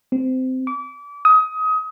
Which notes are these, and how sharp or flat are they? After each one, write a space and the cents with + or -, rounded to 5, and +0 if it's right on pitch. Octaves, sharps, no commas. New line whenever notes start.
C4 -20
D6 -30
D#6 +25